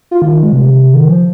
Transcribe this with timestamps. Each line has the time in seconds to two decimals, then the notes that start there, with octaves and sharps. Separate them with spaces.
0.11 F4
0.22 D#3
0.32 D#3
0.43 G#3
0.53 C3
0.94 D#3
1.08 F3